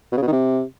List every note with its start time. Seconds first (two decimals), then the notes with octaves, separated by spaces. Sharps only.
0.12 B2
0.17 C#3
0.22 B2
0.27 D#3
0.32 C3